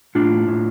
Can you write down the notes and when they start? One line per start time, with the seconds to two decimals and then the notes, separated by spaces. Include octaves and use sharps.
0.15 A2 D4 F4
0.48 A2